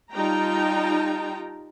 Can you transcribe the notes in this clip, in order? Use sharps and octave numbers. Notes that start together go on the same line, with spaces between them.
G3 D#4 F4 G5 A5 A#5